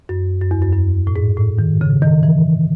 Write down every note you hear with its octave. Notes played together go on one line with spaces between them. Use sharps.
F#2
F#2
E2
F#2
F#2
A2
G#2
A2
D#3
C#3
D#3
E3